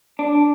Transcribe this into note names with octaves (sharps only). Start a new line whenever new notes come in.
D4